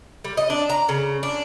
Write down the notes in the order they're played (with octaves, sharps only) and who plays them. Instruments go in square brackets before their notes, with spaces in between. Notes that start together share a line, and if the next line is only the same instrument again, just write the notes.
[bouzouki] G3
D#5
D4
A#5
C#3
D4